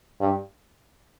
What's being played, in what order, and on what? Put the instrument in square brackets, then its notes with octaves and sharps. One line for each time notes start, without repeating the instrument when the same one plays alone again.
[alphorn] G2